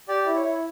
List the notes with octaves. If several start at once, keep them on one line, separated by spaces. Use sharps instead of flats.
G4 D5
E4
C#5
E4